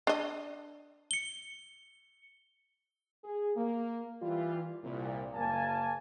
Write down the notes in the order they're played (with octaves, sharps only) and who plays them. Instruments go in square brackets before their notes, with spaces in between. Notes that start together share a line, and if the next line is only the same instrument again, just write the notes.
[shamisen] D4 D#5
[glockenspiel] C#7 G7
[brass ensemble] G#4
A#3
E3 G3 F4
C2 A#2
F#1 A#3 G#5 A5